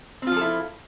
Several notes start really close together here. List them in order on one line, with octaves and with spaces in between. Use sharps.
C4 F4 F3 A4 E4